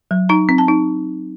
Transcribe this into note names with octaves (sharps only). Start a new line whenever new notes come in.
F#3
D#4 A#5
C4
A5
D#4